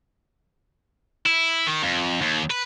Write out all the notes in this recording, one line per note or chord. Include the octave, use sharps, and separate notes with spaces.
E4
D#3
F2
D#2
B4